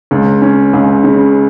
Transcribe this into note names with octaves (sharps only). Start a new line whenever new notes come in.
C#2
C#4
C#2
C#3